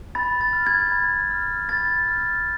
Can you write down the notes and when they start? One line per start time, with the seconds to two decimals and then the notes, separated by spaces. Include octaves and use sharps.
0.15 B5 A6
0.41 A6
0.53 F6
0.67 G#6
0.92 B5
1.31 F6
1.69 B5 A6
2.08 F6